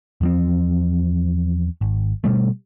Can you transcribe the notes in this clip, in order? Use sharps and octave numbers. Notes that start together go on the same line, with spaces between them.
E2 F3 C4
G#1
B2 G3 A3